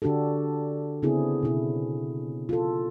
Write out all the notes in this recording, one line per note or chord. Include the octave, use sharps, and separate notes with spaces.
D3 D4 F#4 G4 A4
C#3 B3 C4 E4 G#4
B2 E4
F4 A4